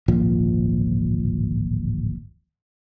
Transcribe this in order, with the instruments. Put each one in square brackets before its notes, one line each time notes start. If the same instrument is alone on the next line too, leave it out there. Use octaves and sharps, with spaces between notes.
[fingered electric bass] D1 G#1 A#2 F3